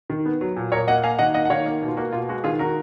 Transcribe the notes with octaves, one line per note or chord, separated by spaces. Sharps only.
D#3
B3
F#3
A#2
A#2 A#4 C#5
A#3 D#5 F#5
A#3 F5 G#5
D#3 D#5 F#5
A#3 D#5 F#5
F#5
D#3 C#5 F5
A#3
B2
F4
A#3 F#4
B2 F4
G#3 F#4
D#3 F4 G#4
D#3 F#4 A#4